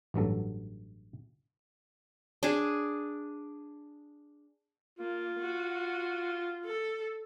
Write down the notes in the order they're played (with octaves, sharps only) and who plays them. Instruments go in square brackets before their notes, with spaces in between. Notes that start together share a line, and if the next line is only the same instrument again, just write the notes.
[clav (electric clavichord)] A1 G2 F#3 A4
[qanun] D4 G#4
[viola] A#3 [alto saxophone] F4
[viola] F#4
A4